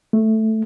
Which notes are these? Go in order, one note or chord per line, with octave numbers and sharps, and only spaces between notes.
A3